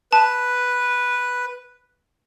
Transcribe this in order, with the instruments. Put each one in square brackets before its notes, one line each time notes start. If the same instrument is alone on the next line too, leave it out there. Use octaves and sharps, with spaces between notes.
[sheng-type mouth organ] B4 [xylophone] A5